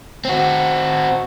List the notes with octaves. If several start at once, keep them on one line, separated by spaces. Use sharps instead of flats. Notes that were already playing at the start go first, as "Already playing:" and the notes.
C4 F#4